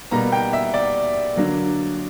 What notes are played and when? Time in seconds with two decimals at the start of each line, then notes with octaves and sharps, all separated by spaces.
0.11 B2 G3 A#3 A#5
0.32 G5
0.53 E5
0.74 D5
1.36 D3 F#3 A#3